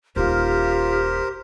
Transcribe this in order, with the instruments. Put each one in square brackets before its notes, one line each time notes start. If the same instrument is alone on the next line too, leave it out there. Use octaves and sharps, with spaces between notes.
[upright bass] D#1 D#4 [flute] F4 [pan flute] G4 [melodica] A#4 C5